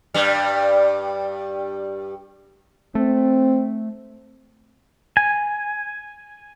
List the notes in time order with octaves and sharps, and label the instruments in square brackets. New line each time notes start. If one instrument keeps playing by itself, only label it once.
[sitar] G2 G3
[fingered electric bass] A3 [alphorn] C4
[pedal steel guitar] G#5